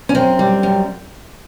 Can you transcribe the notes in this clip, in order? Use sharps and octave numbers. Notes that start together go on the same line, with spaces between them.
C#4
F#2 C4
G3
F#2